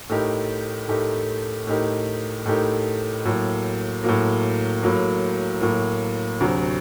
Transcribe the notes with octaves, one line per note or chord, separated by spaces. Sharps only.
A2 A3 D#4 G4 A#4
A2 A3 D#4 G4 A#4
A2 A3 D#4 G4 A#4
A2 A3 D#4 G4 A#4
A2 F#3 A#3
A2 F#3 A#3
A2 F#3 A#3
A2 F#3 A#3
D2 C3 F#3